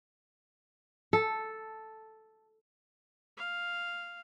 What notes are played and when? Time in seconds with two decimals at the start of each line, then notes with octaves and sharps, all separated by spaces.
1.13 A4
3.37 F5